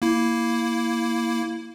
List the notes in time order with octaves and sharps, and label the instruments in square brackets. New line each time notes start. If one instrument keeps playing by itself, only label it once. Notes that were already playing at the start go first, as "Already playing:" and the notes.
[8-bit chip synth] A#3 E4